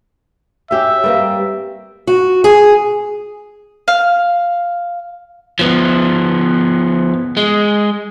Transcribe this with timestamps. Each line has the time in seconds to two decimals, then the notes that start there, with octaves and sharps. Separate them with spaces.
0.71 C#4 G4 E5
1.04 G3 A#3 C4 G4 B4 F5
2.07 F#4
2.44 G#4
3.88 F5
5.59 F3 B3
7.37 G#3